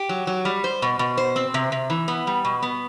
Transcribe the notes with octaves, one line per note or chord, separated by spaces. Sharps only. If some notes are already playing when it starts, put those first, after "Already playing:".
Already playing: G4
F#3
F#3
G3
C5
B2
B2
C5
C4
C3
C3
E3
B3
G3
B2
B3